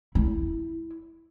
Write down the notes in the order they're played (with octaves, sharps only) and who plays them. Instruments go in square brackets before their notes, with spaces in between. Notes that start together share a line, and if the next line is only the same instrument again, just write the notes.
[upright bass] E4